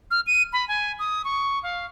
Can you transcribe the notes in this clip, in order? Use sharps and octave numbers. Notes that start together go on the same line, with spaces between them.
F6
D#7
B5
G#5
D#6
C#6
F5